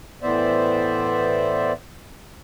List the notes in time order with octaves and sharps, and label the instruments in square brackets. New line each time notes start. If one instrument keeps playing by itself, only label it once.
[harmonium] A2 E3 B3 C5 D5 E5